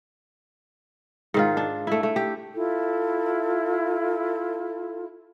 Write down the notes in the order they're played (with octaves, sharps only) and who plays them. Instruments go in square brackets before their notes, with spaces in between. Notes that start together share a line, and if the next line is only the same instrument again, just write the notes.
[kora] G#2 D#3 F4
D4
A3 E4
A3
G4
[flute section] E4 F4 A4